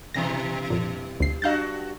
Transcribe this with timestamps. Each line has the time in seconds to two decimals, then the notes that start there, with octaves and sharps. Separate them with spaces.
0.14 G2 B2 E3 A#6
0.70 F2 A#2
1.20 D2 C7
1.42 G2 D4 F#4 F5 G6 A6